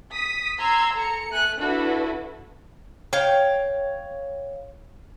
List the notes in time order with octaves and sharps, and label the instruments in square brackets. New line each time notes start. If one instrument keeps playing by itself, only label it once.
[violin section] D#6 B6
A#5 C6 E6 G#6
A4 A#5 C#7
A3 G#5 F#6
D4 E4 F#4 A4 B4
[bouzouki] C#5 F5 G5